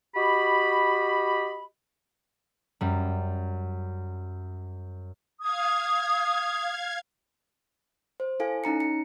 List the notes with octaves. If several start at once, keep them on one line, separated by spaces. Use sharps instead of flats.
F#4 G4 D#5 B5
F#2 G3
F5 D#6 G#6
C5
E4 A4 F5 G#5
C#4 D#4 A#5 C#7
C#7